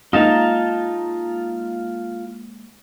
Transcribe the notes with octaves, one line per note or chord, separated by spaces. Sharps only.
G#3 A#3 D#4 F4 A5 A#5